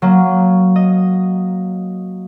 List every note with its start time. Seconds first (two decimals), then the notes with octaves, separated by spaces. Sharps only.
0.02 F#3 A#3
0.76 D#5